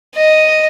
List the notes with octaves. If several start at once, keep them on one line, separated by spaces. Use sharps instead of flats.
D#5